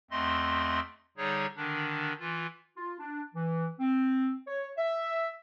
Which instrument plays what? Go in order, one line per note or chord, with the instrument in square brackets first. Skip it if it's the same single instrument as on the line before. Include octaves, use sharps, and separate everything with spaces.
[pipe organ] E2 A3 C4 D#5 C6
D3 G3 D#4 G#4 C#5
D3 D#3 D4
E3 F4
[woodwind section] F4
D4
E3
C4
C#5
E5